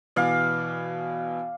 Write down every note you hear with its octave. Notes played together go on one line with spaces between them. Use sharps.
B2 E3 D5 F5